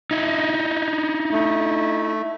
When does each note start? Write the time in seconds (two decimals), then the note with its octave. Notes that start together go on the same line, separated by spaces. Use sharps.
0.11 D#4 E4
1.32 A3